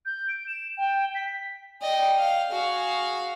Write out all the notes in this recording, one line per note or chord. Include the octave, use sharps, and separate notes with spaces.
G6
D7
E7
G5
B6
D5 D#5 G5
F5
F#4 G#4 F5